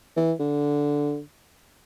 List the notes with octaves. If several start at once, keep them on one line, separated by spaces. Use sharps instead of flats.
E3
D3